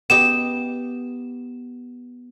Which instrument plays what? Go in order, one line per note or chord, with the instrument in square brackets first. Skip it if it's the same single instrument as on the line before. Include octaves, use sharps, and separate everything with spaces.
[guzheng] B3 G4 D#5 [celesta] E7